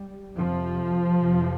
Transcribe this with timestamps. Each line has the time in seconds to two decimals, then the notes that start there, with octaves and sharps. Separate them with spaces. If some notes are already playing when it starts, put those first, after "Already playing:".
Already playing: G3
0.36 F2 C3 F3
1.16 F2 C3